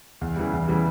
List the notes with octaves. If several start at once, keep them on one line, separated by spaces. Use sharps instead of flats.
E2
C#3 E3 G3
E2
C#3 E3 G3